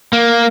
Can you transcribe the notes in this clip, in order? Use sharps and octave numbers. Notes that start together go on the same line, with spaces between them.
A#3